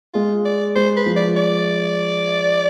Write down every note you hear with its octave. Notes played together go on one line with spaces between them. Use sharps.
G#3 F4
D5
G#3 C5
B4
F3
D5
D5